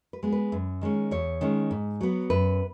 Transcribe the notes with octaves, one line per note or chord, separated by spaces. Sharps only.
B4
G#3 B3
B4
F#2
D#3 G#3 C#4
E2 C#5
D#3 G#3 C#4
G#2
F#3 B3
F#2 B4